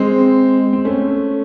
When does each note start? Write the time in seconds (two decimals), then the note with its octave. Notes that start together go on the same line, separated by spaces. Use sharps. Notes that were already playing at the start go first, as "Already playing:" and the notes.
Already playing: G#3 C4
0.73 C4
0.85 A3 C#4